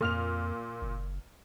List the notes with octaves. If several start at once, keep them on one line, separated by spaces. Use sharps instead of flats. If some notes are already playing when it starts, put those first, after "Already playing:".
F2 A#2 F6 F7
F#1